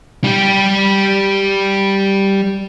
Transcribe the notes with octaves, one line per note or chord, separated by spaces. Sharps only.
G3 G4